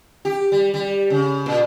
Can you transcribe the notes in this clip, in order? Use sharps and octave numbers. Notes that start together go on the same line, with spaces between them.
G4
G3
G3
C#3
A#2